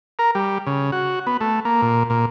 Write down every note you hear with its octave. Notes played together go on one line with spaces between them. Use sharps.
A#4
G3
C#3
F#4
B3
A3
A#3
A#2
A#2